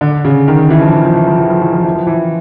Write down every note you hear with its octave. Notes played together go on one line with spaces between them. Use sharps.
D3
C#3
D#3
E3
F3
E3
F3
E3
F3
E3
F3
E3
F3
E3
F3
E3